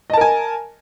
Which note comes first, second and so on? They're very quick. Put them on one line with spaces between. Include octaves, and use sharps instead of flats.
D#5 A5 A#4 G#5